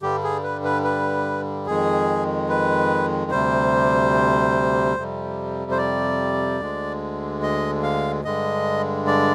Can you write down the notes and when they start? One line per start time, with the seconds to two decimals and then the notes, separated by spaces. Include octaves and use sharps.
0.02 G2 D3 G3 G4
0.23 G#4
0.43 B4
0.64 B4
0.84 B4
1.66 F2 D#3 G#3 G#4
2.49 B4
3.31 D2 C3 G3 C5
4.96 F2 C3 G3
5.71 C5
5.78 D5
6.60 D2 D3 G#3
7.42 D#5
7.83 F5
8.24 G2 D3 G#3 D#5
9.07 D5